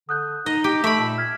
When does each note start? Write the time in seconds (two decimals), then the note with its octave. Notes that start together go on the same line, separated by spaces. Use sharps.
0.09 D3 D#6 F#6 G6
0.46 D#4 D#5
0.64 G4 D7
0.84 A3 A4 E5 B5 C#6 D7
1.00 A#2 A5
1.18 F6 G#6 B6